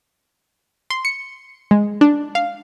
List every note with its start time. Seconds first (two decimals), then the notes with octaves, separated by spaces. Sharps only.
0.90 C6
1.05 C#7
1.71 G#3
2.01 D4
2.35 F5